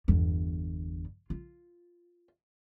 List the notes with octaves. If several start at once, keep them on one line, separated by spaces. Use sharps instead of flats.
G1 E2
F4